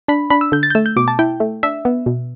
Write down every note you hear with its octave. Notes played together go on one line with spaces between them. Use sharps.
D4 B5
D4 B5
E6
D3 G6
A6
G6
A3 E6
G6
B2 D6
A5
E4 G5
A3
D4 E5
B3
B2